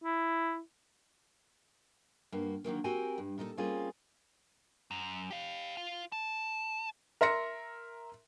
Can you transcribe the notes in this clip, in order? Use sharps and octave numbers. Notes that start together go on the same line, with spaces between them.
E4
G2 A#3 F#4
D3 D#3 F#3 A#3
C4 F#4 G4 A#4 G5 G#5
G2
A#2 D#4 E4 A4
G3 A#3 C4 C#4 F4 G#4
F#2
G4 F5
F4
A5
A#4 E5 C6 A#6 C#7